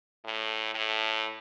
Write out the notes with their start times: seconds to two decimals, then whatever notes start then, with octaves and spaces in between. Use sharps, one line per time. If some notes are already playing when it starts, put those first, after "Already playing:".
0.24 A2
0.74 A2